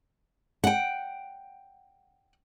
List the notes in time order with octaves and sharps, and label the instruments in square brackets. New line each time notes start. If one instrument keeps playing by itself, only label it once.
[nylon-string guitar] F#5 G5